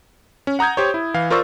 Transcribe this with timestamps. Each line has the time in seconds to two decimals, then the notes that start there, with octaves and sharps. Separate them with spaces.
0.47 C#4
0.59 F#5 A#5 D#6 G6 G#6
0.77 G4 C5 C#5
0.94 E4
1.14 E3 F5
1.30 F4 A#4 C5 D5 C#6 E6